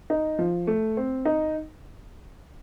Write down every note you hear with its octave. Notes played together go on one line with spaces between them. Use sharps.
D#4
F3
A3
C4
D#4